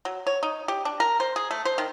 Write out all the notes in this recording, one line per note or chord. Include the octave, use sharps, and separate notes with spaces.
F#3
C#5
D#4
G4
D4
A#4
C5
G#4
A3
C5
D#3